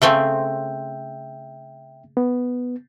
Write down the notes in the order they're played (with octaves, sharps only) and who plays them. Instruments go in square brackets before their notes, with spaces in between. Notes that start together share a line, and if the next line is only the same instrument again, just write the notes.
[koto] C#3 A3 C4 [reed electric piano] E5 G5
[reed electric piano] B3